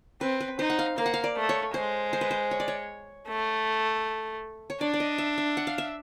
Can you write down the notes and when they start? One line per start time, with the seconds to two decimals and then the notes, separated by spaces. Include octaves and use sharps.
0.21 C4 B4
0.41 B4
0.59 D#4 C5
0.70 F#5
0.79 F5
0.97 A#3 F5
1.06 F#5
1.14 F5
1.24 D5
1.36 A3
1.49 C#5
1.74 G#3 C5
2.13 C5
2.21 B4
2.31 C5
2.51 C#5
2.60 D5
2.68 C#5
3.28 A3
4.70 C#5
4.81 D4 D5
4.94 D5
5.00 D#5
5.18 E5
5.38 E5
5.57 F#5
5.67 F5
5.78 E5